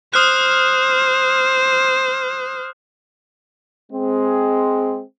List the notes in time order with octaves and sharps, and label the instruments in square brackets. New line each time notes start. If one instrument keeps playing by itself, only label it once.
[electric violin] C5 [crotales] D#6 F6 F#6
[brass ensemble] G#3 C4